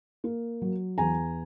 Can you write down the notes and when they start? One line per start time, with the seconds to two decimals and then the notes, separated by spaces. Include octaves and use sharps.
0.24 A#3
0.62 F#3
0.98 E2 G#5 A#5